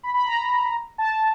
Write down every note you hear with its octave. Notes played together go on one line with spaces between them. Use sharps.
B5
B5
A#5
A5